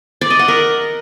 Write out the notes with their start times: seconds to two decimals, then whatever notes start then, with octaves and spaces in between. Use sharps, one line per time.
0.21 D5
0.30 D#5
0.39 F#5
0.48 A#4